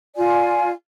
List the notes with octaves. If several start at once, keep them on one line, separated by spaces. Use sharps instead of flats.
F4 D5 G#5